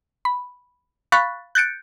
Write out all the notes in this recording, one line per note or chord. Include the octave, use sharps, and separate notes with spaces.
B5
F5 B5 C#6 F#6 A6 B6
F#6 G6 A6 C#7 D7